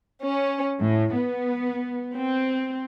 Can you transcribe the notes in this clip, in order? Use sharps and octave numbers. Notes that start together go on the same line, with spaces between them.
C#4
A2
B3
C4